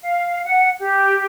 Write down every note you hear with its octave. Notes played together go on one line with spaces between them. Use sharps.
F5
F#5
G4